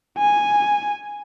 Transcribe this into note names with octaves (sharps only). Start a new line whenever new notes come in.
G#5